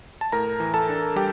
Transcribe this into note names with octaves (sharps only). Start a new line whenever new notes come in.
A5
A2 A#4 A#5
E3
A4 A5
D4
G3 G4 G5